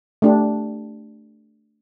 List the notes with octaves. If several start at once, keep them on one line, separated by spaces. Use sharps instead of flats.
A3 D4 G4